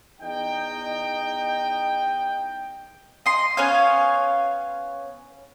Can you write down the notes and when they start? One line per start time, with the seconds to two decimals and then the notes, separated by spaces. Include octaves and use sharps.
0.21 E2 D#4 D#5 G5
3.26 D#5 C6
3.57 B3 C#4 C#5 F5